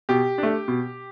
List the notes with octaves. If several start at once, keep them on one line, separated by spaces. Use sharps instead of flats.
B2 G4
A3 D4
B2